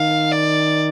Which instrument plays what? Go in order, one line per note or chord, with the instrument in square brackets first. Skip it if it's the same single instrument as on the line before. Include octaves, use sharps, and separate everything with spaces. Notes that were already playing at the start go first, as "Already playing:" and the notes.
Already playing: [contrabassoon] D#3 [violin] F5
[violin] D5